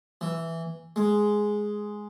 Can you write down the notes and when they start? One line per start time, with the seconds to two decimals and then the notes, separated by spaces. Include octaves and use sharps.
0.21 E3
0.96 G#3